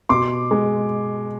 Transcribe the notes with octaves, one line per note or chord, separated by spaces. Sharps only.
B2 C6 D6
G#3